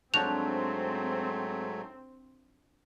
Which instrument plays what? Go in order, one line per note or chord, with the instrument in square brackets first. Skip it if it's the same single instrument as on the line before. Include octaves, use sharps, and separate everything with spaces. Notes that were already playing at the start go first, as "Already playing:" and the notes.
[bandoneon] G#2 F#3 A3 [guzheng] F3 D4 F#4 [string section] C4 [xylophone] F7